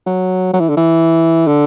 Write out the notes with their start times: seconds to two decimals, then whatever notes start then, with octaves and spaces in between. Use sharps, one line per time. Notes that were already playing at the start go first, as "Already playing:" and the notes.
0.06 F#3
0.53 F#3
0.60 E3
0.69 D3
0.77 E3
1.47 D3